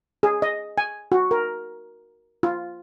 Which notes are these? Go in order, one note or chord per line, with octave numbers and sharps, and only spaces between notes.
G#4
D#5
G#5
F#4
A#4
F4